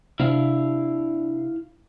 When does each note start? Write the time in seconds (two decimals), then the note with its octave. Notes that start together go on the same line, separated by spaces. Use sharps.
0.20 C3 D4 E4 F5